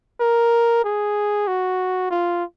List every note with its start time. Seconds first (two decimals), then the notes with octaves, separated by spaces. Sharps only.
0.21 A#4
0.85 G#4
1.48 F#4
2.11 F4